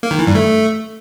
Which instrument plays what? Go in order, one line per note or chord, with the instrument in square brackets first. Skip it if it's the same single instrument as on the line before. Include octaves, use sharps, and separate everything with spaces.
[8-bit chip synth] A#3
D#3
E3
G2
A3